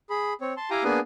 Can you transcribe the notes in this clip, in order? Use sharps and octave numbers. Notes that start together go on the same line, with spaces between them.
G#4 B5
C4 C#5
A5 C6
E4 G4 F5 G5 G#5 A#5
A#3 B3 D4 G#4 B4 G#5